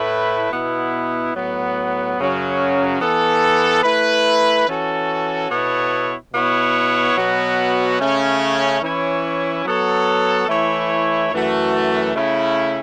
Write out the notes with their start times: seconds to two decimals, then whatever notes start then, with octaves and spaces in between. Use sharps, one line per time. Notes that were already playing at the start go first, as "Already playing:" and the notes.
Already playing: A2 A3 E4 B4
0.52 B2 B3 E4
1.34 A2 F#3 B3
2.18 F#2 C#3 F#3 C#4
3.01 E3 B3 A4
3.84 A3 E4 B4
4.67 E3 C#4 F#4 A4
5.50 B2 B3 E4 A4 C#5
6.33 B2 B3 E4 C#5
7.16 B2 F#3 B3 F#4
8.00 C#3 A3 C#4
8.82 E3 C#4 E4 C#5
9.65 F#3 B3 A4 C#5
10.49 E3 A3 E4 C#5
11.32 F#2 E3 A3 F#4
12.15 C#3 A3 C#4 E4